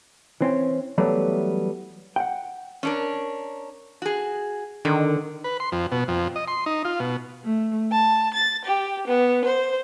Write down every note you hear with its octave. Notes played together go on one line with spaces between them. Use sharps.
E3 C4 C#4
E3 F#3 G3 A3 B3
F#5 G5
C#4 D4 A#4
F#4 G#4
D3 D#3
B4
C6
F2
B2
F2
D#5
C6
D#4
F4
B2
A3
A5
A6
G4
B3
C5